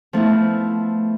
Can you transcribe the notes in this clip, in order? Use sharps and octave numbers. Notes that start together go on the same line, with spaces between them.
F3 A3 B3 E4